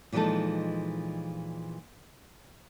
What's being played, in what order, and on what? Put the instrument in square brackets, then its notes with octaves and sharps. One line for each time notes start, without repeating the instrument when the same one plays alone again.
[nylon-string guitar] A#2 E3 F3 G#3 D#4 A4